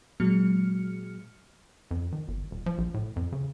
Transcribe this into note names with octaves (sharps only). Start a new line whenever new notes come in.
A#2 F#3 G#3 F6 C#7
F2
D#3
G1
D#1
F3
A#1
A2
F2
C#3